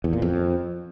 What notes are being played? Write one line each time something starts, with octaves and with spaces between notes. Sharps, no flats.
E2
A#2
F2